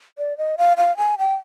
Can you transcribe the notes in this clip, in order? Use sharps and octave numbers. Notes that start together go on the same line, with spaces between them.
D5
D#5
F5
F5
G#5
G5